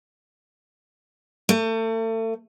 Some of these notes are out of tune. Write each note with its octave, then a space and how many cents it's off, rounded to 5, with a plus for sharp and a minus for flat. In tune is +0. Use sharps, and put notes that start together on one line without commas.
A3 +35